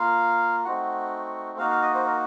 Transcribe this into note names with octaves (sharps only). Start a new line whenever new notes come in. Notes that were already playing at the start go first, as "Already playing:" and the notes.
Already playing: A#3 F4 F5
A3 C4 D#4 F#4 F#5
A#3 D#4 F#4 F5
F5
D#5
C5
A#4